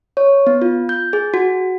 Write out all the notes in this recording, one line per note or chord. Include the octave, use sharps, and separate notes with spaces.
C#5
B3
F4
G6
G#4
F#4